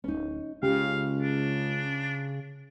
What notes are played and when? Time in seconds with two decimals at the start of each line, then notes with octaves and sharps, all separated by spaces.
0.04 D1 C#4 D#4
0.63 C#2 C#3 G4 F5
1.22 D4